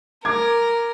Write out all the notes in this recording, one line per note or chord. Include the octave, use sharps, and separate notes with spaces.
A#4 D6 G#6